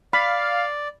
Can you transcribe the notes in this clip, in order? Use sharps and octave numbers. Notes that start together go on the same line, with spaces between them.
D5 F5 B5